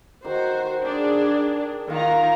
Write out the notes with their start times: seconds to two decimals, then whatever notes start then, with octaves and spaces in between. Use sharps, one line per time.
0.25 D#3 F#4 C5
0.84 D4 G#4
1.90 D#3 F4 F#5 A#5